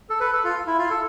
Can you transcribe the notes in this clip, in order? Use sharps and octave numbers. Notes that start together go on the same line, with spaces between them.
A4
B4
A4
F4
E4
F4
A4